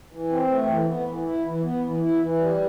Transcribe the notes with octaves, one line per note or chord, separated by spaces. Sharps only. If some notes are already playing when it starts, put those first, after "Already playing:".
E3
C4
A3
E3
B3
E3
E4
E3
B3
E3
E4
E3
G3